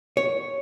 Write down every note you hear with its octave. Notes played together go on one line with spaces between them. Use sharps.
C#5